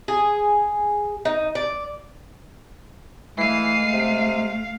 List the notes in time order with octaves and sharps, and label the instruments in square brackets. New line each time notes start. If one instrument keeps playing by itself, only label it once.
[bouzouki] G#4
D#4
D5
[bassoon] E3 [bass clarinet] G#3 [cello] A3 F5 [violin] C7 D#7
[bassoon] C3